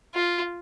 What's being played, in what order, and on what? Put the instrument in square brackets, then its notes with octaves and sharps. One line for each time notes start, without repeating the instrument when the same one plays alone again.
[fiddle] F4